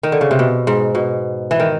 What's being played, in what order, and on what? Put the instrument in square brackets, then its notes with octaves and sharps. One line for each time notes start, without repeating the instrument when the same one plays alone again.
[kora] D#3
D3
C#3
C3
B2
G#2
B2
E3
D#3